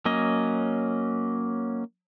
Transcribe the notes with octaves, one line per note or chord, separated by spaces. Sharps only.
F#3 A#3 C#4 D#5